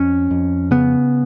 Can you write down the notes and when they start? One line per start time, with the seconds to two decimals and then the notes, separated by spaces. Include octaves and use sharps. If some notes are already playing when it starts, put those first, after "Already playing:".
Already playing: F2 C#4
0.31 F2
0.71 C#3 B3